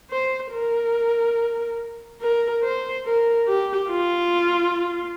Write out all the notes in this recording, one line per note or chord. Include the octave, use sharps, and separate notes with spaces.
C5
A#4
A#4
C5
A#4
G4
F4